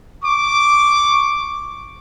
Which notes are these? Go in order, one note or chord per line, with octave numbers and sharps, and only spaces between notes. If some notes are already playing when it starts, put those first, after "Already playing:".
C#6 D6